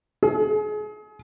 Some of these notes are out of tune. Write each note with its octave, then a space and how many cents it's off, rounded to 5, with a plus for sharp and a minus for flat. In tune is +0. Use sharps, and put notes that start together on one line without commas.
G#4 +35